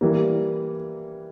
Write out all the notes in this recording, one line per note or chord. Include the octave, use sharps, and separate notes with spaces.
E3 G3 A#3